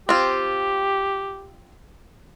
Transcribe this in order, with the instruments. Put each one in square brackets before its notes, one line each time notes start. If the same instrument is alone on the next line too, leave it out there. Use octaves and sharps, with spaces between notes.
[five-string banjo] C4 F4 [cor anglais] G4